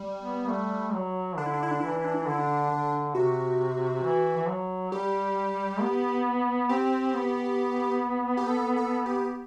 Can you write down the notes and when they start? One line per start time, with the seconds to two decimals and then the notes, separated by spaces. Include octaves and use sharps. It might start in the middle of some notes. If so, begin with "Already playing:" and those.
Already playing: G3
0.20 B3
0.49 A3
0.93 F#3
1.38 D3 D4
1.46 E4
1.54 D4
1.63 E4
1.71 D4
1.80 E3 E4
1.88 D4
1.96 E4
2.04 D4
2.14 E4
2.22 D4
2.27 D3 E4
2.38 D4
2.71 D3
3.15 C3 F#4
4.03 E3
4.37 E3
4.48 F#3
4.92 G3 G4
5.81 B3
6.69 C4 G4
7.13 B3
8.37 G4
8.47 A4
8.76 A4
9.06 G4